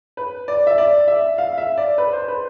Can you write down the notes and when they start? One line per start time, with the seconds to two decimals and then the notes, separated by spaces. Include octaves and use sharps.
0.17 B4
0.48 D5
0.67 E5
0.78 D5
1.08 E5
1.38 F5
1.58 E5
1.78 D5
1.98 B4
2.13 C5
2.28 B4